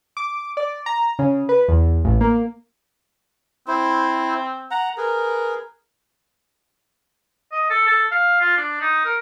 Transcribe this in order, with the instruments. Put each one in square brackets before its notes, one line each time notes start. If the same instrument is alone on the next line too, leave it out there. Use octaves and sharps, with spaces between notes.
[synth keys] D6
D5
A#5
C#3
B4
E2
A1
A#3
[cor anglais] C4 [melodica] E4 C5
[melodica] F#5 A#5
[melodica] G#4 B4 [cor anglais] A#4
[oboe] D#5
A4
A4
F5
F4
D4
D#4
A#4